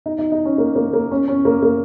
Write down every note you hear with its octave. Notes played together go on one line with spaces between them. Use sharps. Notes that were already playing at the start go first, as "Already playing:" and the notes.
D#4
D#4
D#4
C#4
A#3
A#3
A#3
C#4
C#4
A#3
A#3